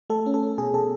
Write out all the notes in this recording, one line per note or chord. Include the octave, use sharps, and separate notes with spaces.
A3 A4
C#4
A4
C#4
B2 G#4
B2 A4